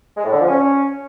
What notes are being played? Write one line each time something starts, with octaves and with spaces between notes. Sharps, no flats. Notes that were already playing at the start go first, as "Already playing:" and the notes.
G#3
A2
D3
F3
C#4